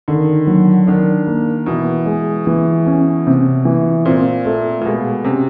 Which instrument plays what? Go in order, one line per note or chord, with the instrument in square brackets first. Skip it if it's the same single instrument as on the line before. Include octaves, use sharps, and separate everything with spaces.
[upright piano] D3 [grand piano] D#3
[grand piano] F#3
[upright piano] D#3 [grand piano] D4
[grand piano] A#3
[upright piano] B2 [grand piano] E3
[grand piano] G#3
E3
C#4
C3
E3
[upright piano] A#2 [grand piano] C4
[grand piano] A3
[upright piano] A#2
[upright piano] B2 [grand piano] G#3
[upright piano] C3 [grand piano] C#4